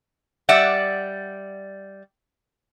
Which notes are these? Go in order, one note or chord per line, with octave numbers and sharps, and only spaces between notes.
G3 D5 E5 F#5